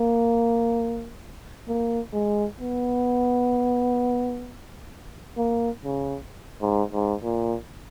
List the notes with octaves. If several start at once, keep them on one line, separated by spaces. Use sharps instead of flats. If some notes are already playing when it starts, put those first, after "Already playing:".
Already playing: A#3
A#3
G#3
B3
A#3
C#3
G#2
G#2
A#2